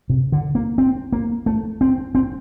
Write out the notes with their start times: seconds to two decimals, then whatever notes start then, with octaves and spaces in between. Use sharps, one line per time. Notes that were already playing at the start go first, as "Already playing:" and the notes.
0.10 C3
0.32 D3
0.55 A#3
0.78 C4
1.12 A#3
1.46 A3
1.81 C4
2.15 C4